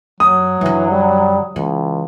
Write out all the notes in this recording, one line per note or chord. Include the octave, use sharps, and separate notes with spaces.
F#2 F#3 D#6
F#2 D3 E3
G3
C#2 E3